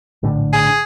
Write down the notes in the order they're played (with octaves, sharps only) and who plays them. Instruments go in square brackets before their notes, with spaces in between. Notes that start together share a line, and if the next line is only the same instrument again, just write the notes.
[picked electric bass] A#1 A2 D3
[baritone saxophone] G#4